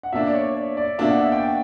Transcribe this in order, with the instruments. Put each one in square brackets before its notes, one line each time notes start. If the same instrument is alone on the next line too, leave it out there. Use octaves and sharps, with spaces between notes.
[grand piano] F#5
[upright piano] B2 A#3 D4 [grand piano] E5
[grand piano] D5
C#5
C#5
D5
[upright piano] B2 A#3 D4 [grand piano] E5
[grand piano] F#5
E5
G5
F#5